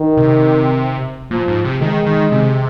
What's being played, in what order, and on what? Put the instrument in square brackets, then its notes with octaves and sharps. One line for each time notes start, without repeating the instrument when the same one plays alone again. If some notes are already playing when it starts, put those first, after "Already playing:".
Already playing: [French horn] D#3
[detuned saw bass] C3
[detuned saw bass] A#2 [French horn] F3
[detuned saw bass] G#2
C3
[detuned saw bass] D#3 [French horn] G#3
[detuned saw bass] D#3
C3